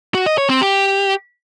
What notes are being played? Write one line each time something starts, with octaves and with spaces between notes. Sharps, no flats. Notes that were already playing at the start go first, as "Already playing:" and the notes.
F#4
D#5
C#5
C4
G4